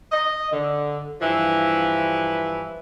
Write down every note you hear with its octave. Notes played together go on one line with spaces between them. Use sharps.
D#5
D3
G2 E3 F3 E4